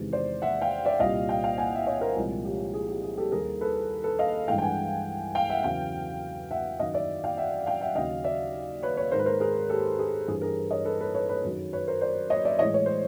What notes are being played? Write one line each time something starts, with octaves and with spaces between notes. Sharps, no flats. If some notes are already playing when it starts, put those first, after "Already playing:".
Already playing: E2 C3 D#3 G#3
C5 D5
E5 F#5
F5 G5
D5 E5
C2 A#2 G3 D#5 F5
F5 G5
F5 G5
F#5 G#5
E5
C#5 D#5
A#4 C5
C2 A#2 F3 G#3
G4
G#4
G4
G#4
G4 A4
D#2 D#3 G3 G#4 A#4
A4 B4
A4 B4
D#5 F5
G2 E3 G#3 F5 G5
G5
F#5 G#5
F5 G5
E5 F#5
E2 C#3 F#3 F5 G5
E5 F#5
F#2 D#3 F#3 D#5 F5
D5 E5
F5 G5
E5 F#5
F5 G5
E5 F#5
D#2 C#3 F#3 D#5 F5
D5 E5
B4 C#5
B4 C#5
G#2 D#3 G#3 A#4 C5
B4
A#4 C5
G#4 A#4
G4 A4
G#4
G2 E3 G3 G#4
G#4 A#4
C#5 D#5
A4 B4
A4 B4
B4 C#5
B4 C#5
F#2 D#3 F#3
B4 C#5
A#4 C5
C5 D5
C#5 D#5
D5 E5
A2 E3 G#3 C#5 D#5
C#5
C5